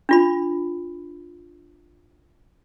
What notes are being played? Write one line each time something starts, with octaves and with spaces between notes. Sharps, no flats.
D4 F4 B5